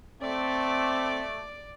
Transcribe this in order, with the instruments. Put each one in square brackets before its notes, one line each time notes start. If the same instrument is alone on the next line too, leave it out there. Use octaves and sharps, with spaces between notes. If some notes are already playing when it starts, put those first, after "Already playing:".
[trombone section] A3 [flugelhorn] C4 [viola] D5 D6